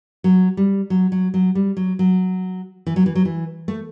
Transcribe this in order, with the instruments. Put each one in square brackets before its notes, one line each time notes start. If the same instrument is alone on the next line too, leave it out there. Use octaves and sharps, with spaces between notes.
[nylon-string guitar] F#3
G3
F#3
F#3
F#3
G3
F#3
F#3
E3
F#3
E3
F#3
E3
A3